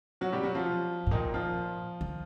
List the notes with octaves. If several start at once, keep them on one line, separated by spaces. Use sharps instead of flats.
F#3 F#4
G3 G4
F#3 F#4
F3 F4
A2
A#2 D#3 D#4
F3 F4
D#3